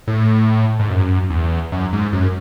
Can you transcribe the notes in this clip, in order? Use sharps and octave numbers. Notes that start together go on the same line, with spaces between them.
A2
G#2
F#2
E2
F#2
G#2
F#2